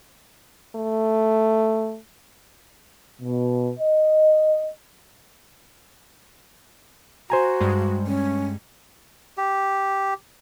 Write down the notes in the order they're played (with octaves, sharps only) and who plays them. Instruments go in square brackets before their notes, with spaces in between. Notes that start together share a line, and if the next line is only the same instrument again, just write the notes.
[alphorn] A3
[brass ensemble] B2
D#5
[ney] F#4 [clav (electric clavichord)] C5 G#5 A#5
[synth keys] G2 G3 G#3
[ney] C#4
[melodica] G4